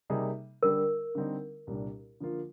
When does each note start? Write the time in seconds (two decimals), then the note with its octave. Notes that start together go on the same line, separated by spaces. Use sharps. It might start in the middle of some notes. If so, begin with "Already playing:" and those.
0.10 C3 G3 A#3 D#4 G#4
0.63 D3 G3 D4 A#4
1.15 D3 G3 C4 D#4
1.67 C2 A#2 G3 D4
2.20 D3 F3 A#3 F4